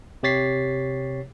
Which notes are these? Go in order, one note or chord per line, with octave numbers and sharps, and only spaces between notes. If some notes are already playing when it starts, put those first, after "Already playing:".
C3 G4 C#5 A6 B6 C7